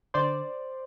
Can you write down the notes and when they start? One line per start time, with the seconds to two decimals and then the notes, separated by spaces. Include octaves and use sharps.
0.14 D3 C5 D5